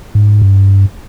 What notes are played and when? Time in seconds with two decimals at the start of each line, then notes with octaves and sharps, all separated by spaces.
0.15 G#2
0.42 G2